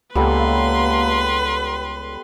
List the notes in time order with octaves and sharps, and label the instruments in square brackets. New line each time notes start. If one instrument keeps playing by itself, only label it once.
[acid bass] C#2 [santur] G3 B3 A4 [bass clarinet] A#3 [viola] B4 C6